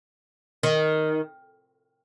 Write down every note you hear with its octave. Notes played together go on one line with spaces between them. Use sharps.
D#3